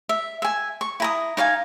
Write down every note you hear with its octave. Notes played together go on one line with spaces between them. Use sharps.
E5
E5 G#5
C#6
E4 A#5 D#6
D#4 D5 F5 G#5